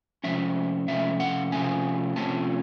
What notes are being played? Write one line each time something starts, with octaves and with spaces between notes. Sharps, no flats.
C3 F3 A3 C#4 E5
C3 F3 A3 C#4 E5
F#5
C3 F3 A3 C#4 G#5
C3 F3 A3 C#4 A5